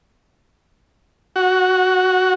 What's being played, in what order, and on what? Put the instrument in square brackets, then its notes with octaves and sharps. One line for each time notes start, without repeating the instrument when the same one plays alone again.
[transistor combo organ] F#4